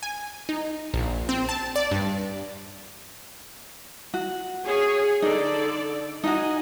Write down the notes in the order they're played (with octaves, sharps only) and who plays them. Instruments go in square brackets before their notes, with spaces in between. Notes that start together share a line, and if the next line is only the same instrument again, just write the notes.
[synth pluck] G#5
D#4
A#1
C4
A5
D5
G2
[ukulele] F#4
[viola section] G#4 C#5 G#5
[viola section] D3 A4 D5 [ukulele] D#4
[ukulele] D#4 F4 F#4 [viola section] D#5 G#5